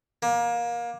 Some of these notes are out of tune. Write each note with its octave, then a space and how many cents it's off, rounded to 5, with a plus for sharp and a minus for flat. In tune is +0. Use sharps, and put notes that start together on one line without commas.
A#3 +25